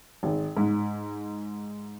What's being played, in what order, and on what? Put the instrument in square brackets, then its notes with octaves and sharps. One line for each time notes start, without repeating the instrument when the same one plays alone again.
[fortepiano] G#1
G#2